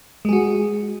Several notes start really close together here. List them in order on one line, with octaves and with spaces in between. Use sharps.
G#3 G#4 F#4